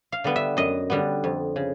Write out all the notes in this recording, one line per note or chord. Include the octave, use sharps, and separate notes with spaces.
F5
D3 G3 B3
E5
F#2 D#5
D3 G3 B3
F2
C#3